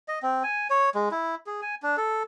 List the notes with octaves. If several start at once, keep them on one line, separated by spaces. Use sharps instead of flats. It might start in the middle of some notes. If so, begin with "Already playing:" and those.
D#5
C4
G#5
C#5
G#3
E4
G#4
G#5
D4
A4